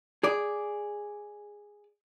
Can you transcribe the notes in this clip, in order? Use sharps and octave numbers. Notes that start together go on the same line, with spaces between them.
G#4 D5